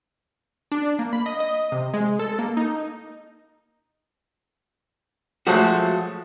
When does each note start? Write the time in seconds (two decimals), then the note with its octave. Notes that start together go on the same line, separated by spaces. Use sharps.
0.72 D4
0.99 A#3
1.13 B5
1.26 D#5
1.40 D#5
1.72 C3
1.94 G#3
2.19 A4
2.39 A#3
2.57 D#4
5.47 F3 F#3 G#3 A3 F#4